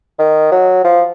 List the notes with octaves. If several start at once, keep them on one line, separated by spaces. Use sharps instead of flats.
D#3
F#3
F3